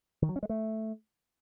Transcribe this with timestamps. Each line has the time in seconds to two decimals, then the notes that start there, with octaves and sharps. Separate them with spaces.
0.22 D#3
0.29 F#3
0.36 C#4
0.43 G#3
0.49 A3